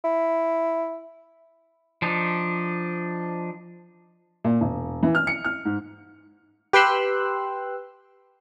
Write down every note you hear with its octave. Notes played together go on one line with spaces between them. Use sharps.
E4
F3 D4 D#4
A#2
E1
E3
F6
C#7
F6
G#2
G4 B4 G5 C6 E6 F#6